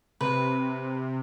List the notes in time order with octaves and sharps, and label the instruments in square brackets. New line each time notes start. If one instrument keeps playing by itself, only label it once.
[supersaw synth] C3 [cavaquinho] B4